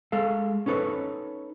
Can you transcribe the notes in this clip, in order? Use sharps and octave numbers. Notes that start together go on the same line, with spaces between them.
G#3 A4 F5
C#4 D#4 A4 B4 C#5